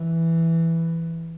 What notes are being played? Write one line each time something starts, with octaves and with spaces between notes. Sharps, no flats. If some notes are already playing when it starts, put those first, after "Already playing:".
Already playing: E3